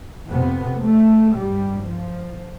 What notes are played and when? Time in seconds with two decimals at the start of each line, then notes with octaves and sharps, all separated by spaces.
0.29 F2 C3 B3
0.81 A3
1.32 G2 G3
1.85 F3